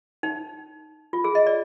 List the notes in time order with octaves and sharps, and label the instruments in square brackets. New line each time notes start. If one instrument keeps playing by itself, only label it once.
[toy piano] D#4
F4
G#4
D#5
D5